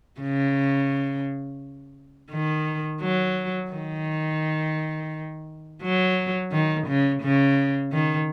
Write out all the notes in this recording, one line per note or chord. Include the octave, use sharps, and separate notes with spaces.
C#3
D#3
F#3
D#3
F#3
D#3
C#3
C#3
D#3